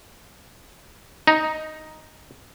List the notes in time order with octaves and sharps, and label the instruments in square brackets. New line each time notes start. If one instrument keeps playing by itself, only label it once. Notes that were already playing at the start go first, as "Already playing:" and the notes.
[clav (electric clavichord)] D#4